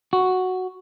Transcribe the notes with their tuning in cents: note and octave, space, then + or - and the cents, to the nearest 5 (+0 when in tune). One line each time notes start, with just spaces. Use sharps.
F#4 +0